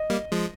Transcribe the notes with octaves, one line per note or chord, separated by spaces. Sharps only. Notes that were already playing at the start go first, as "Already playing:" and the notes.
Already playing: D#5
G3 A#3
F3 G#3